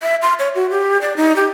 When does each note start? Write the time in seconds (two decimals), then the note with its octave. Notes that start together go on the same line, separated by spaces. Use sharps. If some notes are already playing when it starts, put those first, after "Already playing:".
0.03 E5
0.22 C6
0.39 C#5
0.55 F#4
0.70 G4
1.01 D5
1.17 D#4
1.36 G4